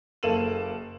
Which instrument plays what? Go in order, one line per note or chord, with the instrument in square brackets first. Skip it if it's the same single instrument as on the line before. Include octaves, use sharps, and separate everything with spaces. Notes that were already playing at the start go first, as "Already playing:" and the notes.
[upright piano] F#1 A#3 A4 D#7 E7 F#7